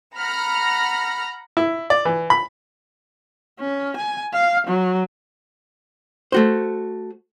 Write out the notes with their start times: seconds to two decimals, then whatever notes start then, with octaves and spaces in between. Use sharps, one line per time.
0.17 F#5 A#5 B5 F6
1.57 E4
1.90 D5
2.05 E3
2.30 B5
3.60 C#4
3.97 G#5
4.33 F5
4.67 F#3
6.32 A3 F#4 C5